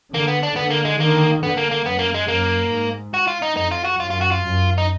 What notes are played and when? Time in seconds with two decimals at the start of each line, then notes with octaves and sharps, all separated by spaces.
0.14 D3 A#3
0.27 B3
0.43 D4
0.56 D3 B3
0.70 A#3
0.85 G#3
0.99 D#3 A#3
1.43 D3 B3
1.57 A#3
1.71 A#3
1.85 F#2 B3
1.99 A#3
2.14 G#3
2.28 F#2 A#3
2.71 G#2
3.14 F#4
3.27 F4
3.42 D#4
3.56 F2 D#4
3.71 F4
3.85 F#4
3.99 F#2 F4
4.10 F4
4.21 F#4
4.31 F4
4.42 F#2
4.78 D#4